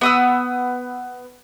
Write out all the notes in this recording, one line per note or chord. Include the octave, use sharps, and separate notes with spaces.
B3 D#6 E6